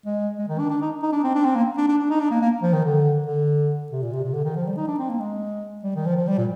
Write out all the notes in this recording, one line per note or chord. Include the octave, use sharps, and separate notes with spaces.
G#3
G#3
D#3
D4
D4
D#4
D#4
D4
C4
D4
C4
A#3
D4
D4
D4
D#4
D4
A#3
A#3
F3
D#3
D3
D3
C3
A#2
C3
C3
D3
D#3
F3
G3
D#4
D4
C4
A#3
G#3
G3
D#3
F3
F3
G3
A#2